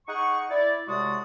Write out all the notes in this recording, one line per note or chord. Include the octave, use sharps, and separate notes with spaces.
D#4 G#4 F#5 C#6
E4 D5
A2 C3 G#3 F#4 D5 D#6